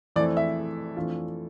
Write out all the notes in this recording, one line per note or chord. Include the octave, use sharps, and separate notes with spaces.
F2 E3 A3 C4 E4 D5
E5
F2 E3 A3 D4 F4